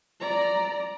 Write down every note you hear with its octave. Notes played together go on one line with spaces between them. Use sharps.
D5 A#5